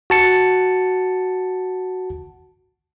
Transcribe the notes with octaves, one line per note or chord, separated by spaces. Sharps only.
F#4 A5 C#7